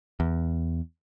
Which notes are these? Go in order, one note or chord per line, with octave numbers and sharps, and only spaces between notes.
E2